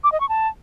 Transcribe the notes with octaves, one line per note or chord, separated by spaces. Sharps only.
D6
D#5
C#6
A5